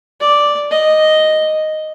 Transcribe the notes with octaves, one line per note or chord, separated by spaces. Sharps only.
D5
D#5